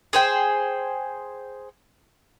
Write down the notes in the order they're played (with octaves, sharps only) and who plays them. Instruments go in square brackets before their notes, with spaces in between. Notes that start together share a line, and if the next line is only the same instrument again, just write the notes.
[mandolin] G#4 C5 G5